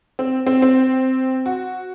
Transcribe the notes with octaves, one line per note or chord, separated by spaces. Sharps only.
C4
C4
C4
F#4